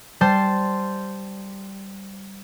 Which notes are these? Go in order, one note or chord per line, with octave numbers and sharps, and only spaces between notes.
G3 C5 A5 C6